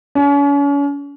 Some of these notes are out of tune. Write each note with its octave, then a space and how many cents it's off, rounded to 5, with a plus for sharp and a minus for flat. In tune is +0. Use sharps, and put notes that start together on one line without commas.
C#4 +40